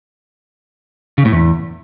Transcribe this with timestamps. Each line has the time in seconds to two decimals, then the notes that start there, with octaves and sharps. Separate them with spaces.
1.18 C#3
1.25 A2
1.32 E2